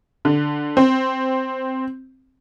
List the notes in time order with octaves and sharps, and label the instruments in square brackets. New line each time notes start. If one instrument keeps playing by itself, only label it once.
[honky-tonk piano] D3
C4